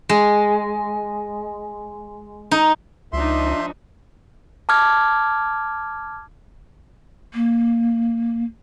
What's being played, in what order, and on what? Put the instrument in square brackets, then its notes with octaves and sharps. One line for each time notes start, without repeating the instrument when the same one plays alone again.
[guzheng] G#3
D#4
[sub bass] C#2 [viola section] F3 D4 D#4 [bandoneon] E5 C6
[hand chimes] A5 D6 F6 G#6
[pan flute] A#3